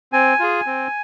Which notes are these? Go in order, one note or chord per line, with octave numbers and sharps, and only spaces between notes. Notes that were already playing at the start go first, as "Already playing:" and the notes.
C4 G#5
F4 G#4
C4